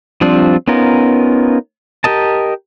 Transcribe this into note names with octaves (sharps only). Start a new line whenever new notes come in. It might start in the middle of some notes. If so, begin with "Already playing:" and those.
F3 G3 C4 D4 F4
B3 C#4 D#4 F4 A#4
G4 A#4 D#5 A5